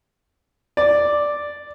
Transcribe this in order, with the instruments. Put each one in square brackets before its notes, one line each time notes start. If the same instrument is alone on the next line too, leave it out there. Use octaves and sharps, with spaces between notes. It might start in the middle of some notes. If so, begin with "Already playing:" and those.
[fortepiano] D5